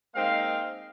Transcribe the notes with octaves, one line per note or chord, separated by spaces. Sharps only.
G#3 A#3 C4 D#4 F5